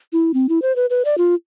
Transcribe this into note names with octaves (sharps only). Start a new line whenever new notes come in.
E4
C4
E4
C5
B4
B4
D5
F4